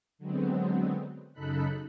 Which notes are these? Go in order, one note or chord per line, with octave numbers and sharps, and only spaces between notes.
D3 F#3 G#3 B3 C4
F#2 C#3 D#4 A4 B5 F#6